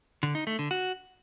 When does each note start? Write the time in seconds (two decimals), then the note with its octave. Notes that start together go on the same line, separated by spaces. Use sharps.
0.23 D3
0.35 D#4
0.47 A3
0.59 D3
0.71 F#4